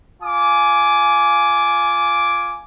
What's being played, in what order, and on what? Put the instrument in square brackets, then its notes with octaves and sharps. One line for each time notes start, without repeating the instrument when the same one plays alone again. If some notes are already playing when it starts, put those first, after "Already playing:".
[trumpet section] F4 G#5 D6